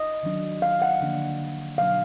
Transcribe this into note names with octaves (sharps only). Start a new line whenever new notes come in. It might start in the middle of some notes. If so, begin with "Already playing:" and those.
Already playing: D#5
D#3 F#3 D4
F5
F#5
D3 F3 A#3 D4
B2 F#3 D4 F5